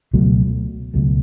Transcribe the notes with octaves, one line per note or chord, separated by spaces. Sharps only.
C#2 B2 F#3 A3
C#2 B2 F#3 A3